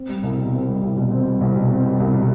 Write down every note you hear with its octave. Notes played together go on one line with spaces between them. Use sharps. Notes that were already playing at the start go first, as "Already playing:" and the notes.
Already playing: C4
G3
C2
B2
C4
G3
C2
B2
C4
G3
C2
B2
C4
G3
C2
B2